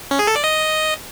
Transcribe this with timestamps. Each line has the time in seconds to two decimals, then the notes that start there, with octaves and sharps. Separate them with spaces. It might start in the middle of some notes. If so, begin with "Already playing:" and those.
0.11 C#4
0.19 G#4
0.27 A4
0.36 D5
0.44 D#5